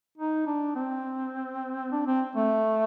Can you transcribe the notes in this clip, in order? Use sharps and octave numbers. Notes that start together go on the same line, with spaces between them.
D#4
D4
C4
D4
C4
A3